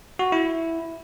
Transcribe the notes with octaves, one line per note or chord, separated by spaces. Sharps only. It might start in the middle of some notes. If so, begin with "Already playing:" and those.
F#4
E4